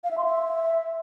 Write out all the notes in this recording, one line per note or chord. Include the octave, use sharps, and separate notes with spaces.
F5
E5
C6
E5